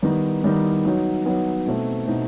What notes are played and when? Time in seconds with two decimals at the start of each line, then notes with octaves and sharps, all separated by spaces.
0.02 D#3 G3 B3 D#4
0.44 D#3 G3 B3 D#4
0.85 F#3 B3 D#4
1.25 F#3 B3 D#4
1.67 B2 A3 C4 D#4
2.07 B2 A3 C4 D#4